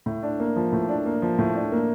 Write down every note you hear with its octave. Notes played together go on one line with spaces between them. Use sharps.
A2
D4
A#3
F3
A2
D4
A#3
F3
A2
D4
A#3